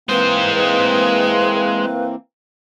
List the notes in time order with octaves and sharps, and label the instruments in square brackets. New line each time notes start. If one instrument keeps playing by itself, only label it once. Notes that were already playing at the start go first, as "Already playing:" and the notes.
[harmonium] E3 A#3 C4 [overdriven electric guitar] G#3 C5 [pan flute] B4